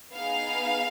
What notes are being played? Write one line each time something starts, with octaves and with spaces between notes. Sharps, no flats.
B3 D#4 G#4 F5